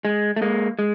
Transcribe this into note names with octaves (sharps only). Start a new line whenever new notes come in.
G#3
A3
G#3 A#3
G#3